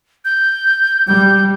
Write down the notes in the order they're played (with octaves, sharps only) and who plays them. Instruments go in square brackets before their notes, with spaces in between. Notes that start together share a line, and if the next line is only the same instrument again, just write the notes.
[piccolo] G6
[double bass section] G3 [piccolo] G6